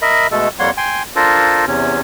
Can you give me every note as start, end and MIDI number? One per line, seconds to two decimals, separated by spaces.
0.02 0.27 70
0.02 0.27 75
0.02 0.27 76
0.02 0.27 83
0.31 0.48 47
0.31 0.48 56
0.31 0.48 57
0.31 0.48 69
0.59 0.71 41
0.59 0.71 55
0.59 0.71 58
0.59 0.71 73
0.59 0.71 78
0.59 0.71 84
0.77 1.03 79
0.77 1.03 80
0.77 1.03 84
1.16 1.65 62
1.16 1.65 65
1.16 1.65 69
1.16 1.65 70
1.16 1.65 72
1.67 2.01 40
1.67 2.01 48
1.67 2.01 61